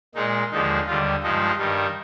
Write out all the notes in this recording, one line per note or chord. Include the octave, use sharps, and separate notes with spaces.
A#2 G#3 D#4
D#2 D3 F3 G#3 D#4
D#2 D3 G3 F4
G2 F3 G#3 D#4
G2 D#3 G3